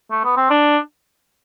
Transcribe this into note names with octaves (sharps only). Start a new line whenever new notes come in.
A3
B3
C4
D4